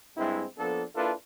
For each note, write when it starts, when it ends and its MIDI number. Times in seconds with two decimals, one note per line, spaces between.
0.16 0.44 43
0.16 0.44 55
0.16 0.44 56
0.16 0.44 60
0.16 0.44 64
0.57 0.83 53
0.57 0.83 58
0.57 0.83 59
0.57 0.83 62
0.57 0.83 69
0.95 1.13 58
0.95 1.13 62
0.95 1.13 64
0.95 1.13 65
0.95 1.13 69
0.95 1.13 71